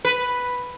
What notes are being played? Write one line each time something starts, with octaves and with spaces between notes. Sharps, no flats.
B4